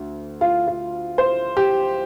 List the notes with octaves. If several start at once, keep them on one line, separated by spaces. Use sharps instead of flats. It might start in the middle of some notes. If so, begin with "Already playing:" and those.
Already playing: D2
F4
F4
C5
G4